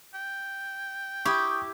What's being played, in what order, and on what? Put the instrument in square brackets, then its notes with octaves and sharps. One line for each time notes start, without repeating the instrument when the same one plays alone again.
[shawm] G5
[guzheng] E4 G4 [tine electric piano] C#6 D#6